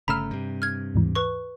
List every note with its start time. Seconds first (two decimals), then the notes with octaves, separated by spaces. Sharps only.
0.08 G1 C#3 A3 A#5 B5 E6 F6
0.31 G2 C3
0.62 F6 G#6
0.95 D#2 G#2 E3
1.15 B4 C#6